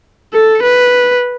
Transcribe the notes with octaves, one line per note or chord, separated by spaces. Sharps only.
A4
B4